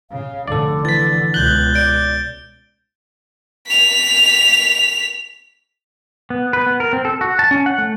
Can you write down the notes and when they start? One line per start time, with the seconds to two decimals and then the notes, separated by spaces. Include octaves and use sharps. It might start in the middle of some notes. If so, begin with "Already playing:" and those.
0.11 C#3 F5
0.48 F1 D3 A4 D5
0.85 E3 A6 B6
1.34 C#2 B2 F#6 G6 G7
1.74 D5 G6 D7
3.67 B6 F7
6.30 B3
6.53 B4
6.66 B3
6.80 A#4
6.93 C4
7.05 A4
7.21 F#4
7.39 A5
7.51 C#4
7.66 F#5
7.78 A3